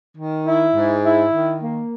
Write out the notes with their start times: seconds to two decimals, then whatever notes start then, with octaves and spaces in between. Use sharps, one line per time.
0.18 D#3
0.46 E4
0.75 G#2
1.04 E4
1.33 D#3
1.62 A#3